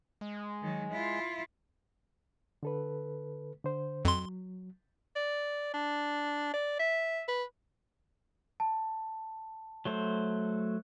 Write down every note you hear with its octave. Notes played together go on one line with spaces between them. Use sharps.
G#3
D#3 F#3
E4 F4
D3 A4 B4
D3 C5
F2 F#3 C6
D5
D4
D5
E5
B4
A5
F#3 A3 C5